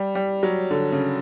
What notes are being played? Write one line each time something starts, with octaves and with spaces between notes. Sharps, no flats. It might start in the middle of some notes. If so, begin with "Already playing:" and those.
Already playing: G3
G3
F#3
D3
C#3